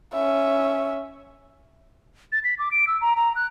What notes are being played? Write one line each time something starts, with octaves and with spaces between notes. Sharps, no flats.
C#4 E5
A6
B6
D6
D7
E6
A#5
A#5
F#6